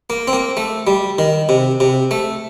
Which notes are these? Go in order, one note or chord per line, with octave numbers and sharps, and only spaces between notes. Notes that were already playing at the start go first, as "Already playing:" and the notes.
A#3
C4
A#3
A3
G3
D#3
C3
C3
A3